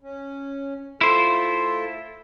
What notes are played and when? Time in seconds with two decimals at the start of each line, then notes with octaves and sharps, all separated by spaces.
0.01 C#4
1.01 A3 E4 F4 A4 C5